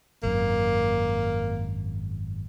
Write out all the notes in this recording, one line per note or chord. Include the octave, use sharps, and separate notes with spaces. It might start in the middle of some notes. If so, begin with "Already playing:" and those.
G#1 F#2 A#3